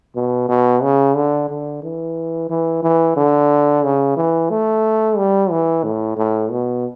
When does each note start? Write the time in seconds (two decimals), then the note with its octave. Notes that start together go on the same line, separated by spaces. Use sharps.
0.15 B2
0.49 B2
0.83 C#3
1.16 D3
1.49 D3
1.83 E3
2.50 E3
2.83 E3
3.17 D3
3.83 C#3
4.16 E3
4.50 A3
5.17 G3
5.51 E3
5.84 A2
6.17 A2
6.51 B2